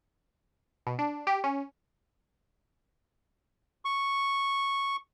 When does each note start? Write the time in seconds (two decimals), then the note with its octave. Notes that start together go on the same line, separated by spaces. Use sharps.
0.87 B2
0.99 D4
1.27 G4
1.44 C#4
3.85 C#6